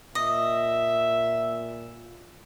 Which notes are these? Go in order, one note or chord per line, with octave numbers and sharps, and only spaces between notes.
A#2 D#5 E5